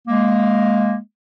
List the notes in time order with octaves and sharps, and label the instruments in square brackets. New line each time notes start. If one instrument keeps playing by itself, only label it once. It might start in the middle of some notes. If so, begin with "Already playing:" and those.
[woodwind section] G#3 A#3